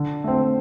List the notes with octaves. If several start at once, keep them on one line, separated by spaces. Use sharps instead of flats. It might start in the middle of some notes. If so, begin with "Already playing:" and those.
Already playing: D3
A3 C4